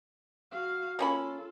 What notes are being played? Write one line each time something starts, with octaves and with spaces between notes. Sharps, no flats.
F#4 F5
A#3 C#4 F4 A4 B5